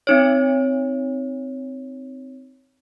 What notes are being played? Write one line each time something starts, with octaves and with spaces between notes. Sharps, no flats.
C4 D#4 C#5